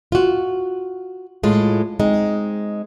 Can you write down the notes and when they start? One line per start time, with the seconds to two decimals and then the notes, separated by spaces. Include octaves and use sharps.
0.12 F4 F#4
1.43 A2 G#3 F4
2.00 G#3 C4 D#4